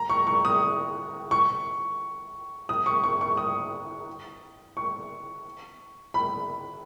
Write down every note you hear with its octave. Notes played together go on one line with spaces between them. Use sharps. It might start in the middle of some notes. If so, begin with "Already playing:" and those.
Already playing: A#5
C#6
C#6
D#6
C#6
D#6
C#6
C#6
C#6
D#6
C#6
B5